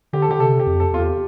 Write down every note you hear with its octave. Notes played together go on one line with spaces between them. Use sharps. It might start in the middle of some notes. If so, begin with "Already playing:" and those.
D3 G4
A4
D3 G4
C3 A4
G4
F2
A4
E2 F4
G4